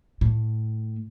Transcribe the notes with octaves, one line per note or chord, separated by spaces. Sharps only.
A2